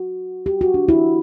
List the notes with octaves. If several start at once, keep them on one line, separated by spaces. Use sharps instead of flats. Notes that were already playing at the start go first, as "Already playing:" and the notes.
Already playing: F#4
G4
F#4
D4
E4